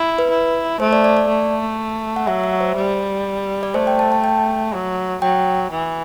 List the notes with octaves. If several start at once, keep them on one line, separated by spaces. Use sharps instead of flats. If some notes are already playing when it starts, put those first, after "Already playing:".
Already playing: E4
B4
E4
A3 C5
D5
D5
D5
A3
F#5
F#3 E5
E5
C5
G3
D5
A3 C5
G5
A5
A5
G5
F#3
F#3 G5
E3